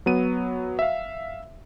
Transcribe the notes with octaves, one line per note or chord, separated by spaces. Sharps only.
F#3 B3 D#7
E5 F5